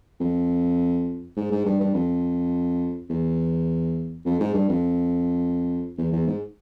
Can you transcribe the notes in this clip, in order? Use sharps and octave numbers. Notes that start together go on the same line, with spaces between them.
F2
G#2
G#2
G2
G2
F2
E2
F2
G#2
G2
F2
E2
E2
G#2